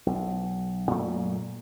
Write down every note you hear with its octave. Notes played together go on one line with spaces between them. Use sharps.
B1
F#2 A#2 F#3 A3